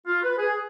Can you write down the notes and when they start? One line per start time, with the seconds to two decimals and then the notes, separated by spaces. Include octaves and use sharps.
0.07 F4
0.23 B4
0.38 G#4